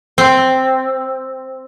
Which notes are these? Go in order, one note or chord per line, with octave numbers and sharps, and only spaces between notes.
C4